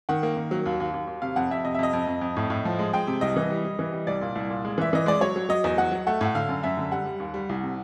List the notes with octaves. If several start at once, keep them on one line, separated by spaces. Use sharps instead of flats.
D#3 F#5
A#3
D#3
F#3
D#2
D#2
D#2
D#2
C3 F5
F2 F#5
F2 E5
C3 D#5
E5
F2 D#5
F2
F2
F2
A2
A2
F3
G#3
G#3 G5
C3
C2 D#5
E3
G3
G3
E3
G3
C2 D5
A#2
C2
A#2
G#3
E3 E5
E3 D#5
G#3 D5
F#3 C#5
F#3
F#3 D#5
E2
F#3 F#5
F#3
A3 F#5
A2 F#5
D3 F5
F#2
F#2 E5
D3
G3 F#5
G3
D#2
G3
C2
C3